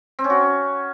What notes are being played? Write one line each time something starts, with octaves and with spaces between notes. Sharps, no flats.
C4
C#4
F#4